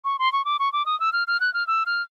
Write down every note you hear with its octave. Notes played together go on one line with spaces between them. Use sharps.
C#6
C6
C#6
D6
C#6
D6
D#6
E6
F6
F6
F#6
F6
E6
F6